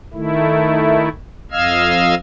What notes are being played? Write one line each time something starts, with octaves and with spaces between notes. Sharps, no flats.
D#3 A3 E4
F2 D#5 F5 E6 F6 G#6